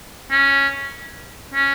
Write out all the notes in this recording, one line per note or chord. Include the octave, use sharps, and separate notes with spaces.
C#4
C#4